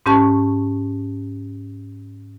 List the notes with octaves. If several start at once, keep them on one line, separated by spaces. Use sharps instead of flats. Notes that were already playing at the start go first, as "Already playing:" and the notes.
G#2 C#4 G4 A5 C#6